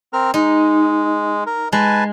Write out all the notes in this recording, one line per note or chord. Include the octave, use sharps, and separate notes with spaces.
C4 A#4 F6
G#3 D#4
A#4
G#3 B4 G#5 A5